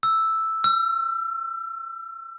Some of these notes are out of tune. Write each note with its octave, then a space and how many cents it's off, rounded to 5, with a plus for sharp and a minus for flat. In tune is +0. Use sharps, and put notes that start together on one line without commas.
E6 +0
E6 +40